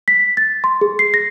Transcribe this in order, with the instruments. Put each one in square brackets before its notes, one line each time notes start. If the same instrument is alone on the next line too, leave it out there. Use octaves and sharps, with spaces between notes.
[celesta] B6
A6
C6
G#4
C7
A#6